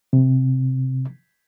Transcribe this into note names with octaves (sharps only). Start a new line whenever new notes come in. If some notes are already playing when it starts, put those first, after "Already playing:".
C3